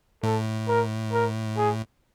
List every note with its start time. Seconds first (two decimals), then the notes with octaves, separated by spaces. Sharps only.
0.23 A2 A4
0.68 A#4
1.12 A#4
1.57 G#4